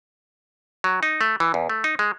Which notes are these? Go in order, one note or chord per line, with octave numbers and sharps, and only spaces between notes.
F#3
D#4
A3
E3
E2
A3
D#4
G#3